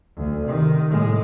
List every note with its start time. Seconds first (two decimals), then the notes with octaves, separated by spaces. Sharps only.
0.17 D2
0.47 C3 D#3
0.90 A2 G#3